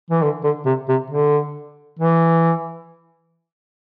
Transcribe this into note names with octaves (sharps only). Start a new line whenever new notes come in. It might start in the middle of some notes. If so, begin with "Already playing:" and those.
E3
D3
D3
C3
C3
D3
E3